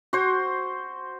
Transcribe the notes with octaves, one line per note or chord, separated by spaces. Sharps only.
F#4 C5